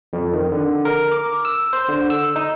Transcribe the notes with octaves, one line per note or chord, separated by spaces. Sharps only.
F2
D#3
D3
A#4
D6
E6
C5
D3
E6
D#4